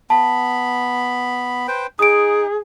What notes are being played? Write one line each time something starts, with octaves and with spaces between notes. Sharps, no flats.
B3 A5 B5
B4 C5 G5
D#4 G#4 D#6 D7